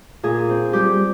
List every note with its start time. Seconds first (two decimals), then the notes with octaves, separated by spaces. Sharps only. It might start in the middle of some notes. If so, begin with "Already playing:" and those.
0.23 A#2 G#4
0.49 C4
0.73 G3 G4